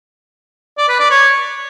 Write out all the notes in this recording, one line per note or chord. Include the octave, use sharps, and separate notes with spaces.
D5
B4
D5
C#5